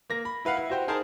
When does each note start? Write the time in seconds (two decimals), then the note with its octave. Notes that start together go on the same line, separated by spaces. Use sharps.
0.10 A#3 A#6
0.25 B5
0.45 E4 B4 F5 F#5
0.57 E4
0.70 F#4 G4 C5 G5
0.88 D#4 G#4 A#4 C5 A5